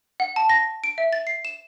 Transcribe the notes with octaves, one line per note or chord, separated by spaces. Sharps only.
F#5
A5
A#6
D7
E5
A6
C7
E7